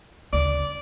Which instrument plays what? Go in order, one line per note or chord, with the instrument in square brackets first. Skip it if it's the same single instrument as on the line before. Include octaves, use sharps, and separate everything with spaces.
[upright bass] D2 C#3 [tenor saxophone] D5